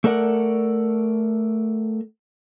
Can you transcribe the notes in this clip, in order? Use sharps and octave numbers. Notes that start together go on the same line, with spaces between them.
A3 A4 A#4 D5 F#5